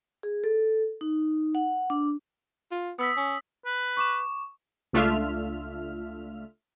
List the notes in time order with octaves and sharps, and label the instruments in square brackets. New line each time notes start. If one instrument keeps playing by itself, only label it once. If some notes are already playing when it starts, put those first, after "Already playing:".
[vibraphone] G#4
A4
D#4
F#5
D4
[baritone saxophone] F4
[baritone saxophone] B3 [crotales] D#6 E6 B6
[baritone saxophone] C#4
[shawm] B4
[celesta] C#6 D6 E7
[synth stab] C#2 A3 D4 F4 E5 F6